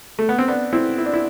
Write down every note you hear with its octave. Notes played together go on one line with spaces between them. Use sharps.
A3
B3
C4
B3 D4
C4 E4
E4
D4
E4